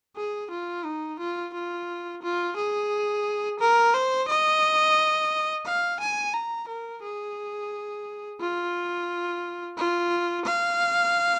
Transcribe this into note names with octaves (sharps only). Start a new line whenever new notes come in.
G#4
F4
D#4
F4
F4
F4
G#4
A#4
C5
D#5
F5
G#5
A#5
A#4
G#4
F4
F4
F5